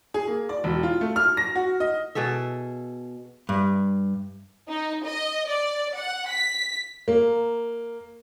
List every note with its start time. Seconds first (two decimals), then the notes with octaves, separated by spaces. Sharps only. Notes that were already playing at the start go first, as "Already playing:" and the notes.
0.14 G#4
0.27 A#3
0.49 D5
0.64 E1
0.83 F4
1.01 A3
1.16 F6
1.37 A#6
1.55 F#4
1.80 D#5
2.15 B2 G#4 A4 E5
3.49 G2
4.69 D#4
5.06 D#5
5.47 D5
5.97 F#5
6.30 B6
7.08 A#3